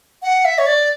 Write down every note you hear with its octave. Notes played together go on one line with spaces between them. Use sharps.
F#5
E5
C#5
D5